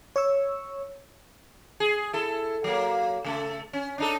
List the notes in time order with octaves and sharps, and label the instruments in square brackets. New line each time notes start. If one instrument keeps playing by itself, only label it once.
[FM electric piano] C#5 C#6 E6
[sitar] G#4
E4 A4
F#3 A#3
C#3 A3 A4
C#4
D4 D#4 A4